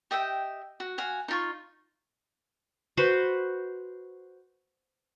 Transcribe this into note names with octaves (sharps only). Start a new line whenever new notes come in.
G4 D#5 E5 G5
F#4
F#4 F5 G#5
D#4 F4 C#6
F#4 B4 C5